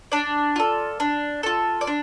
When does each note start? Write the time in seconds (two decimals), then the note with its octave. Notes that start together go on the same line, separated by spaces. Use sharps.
0.12 D4 D5
0.56 F4 A4
1.00 D4
1.43 F4 A4
1.81 D5
1.87 D4